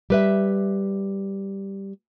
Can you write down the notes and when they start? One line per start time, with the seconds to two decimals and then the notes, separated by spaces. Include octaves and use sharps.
0.10 G3 B4 E5